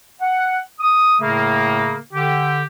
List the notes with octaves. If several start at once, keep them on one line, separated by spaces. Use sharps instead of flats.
F#5
D#6
A2 C#3 A3 A#3
D3 G4